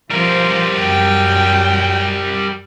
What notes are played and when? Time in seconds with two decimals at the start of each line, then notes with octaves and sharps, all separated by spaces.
0.11 F3 G3 A#4 C5
0.80 F#2 G5